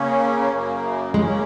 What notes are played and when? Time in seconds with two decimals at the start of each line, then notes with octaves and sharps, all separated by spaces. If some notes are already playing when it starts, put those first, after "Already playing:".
Already playing: C#3 A#3 C#4
0.51 F#2 C#3 A#3
1.13 C#3 G#3 A#3 C#4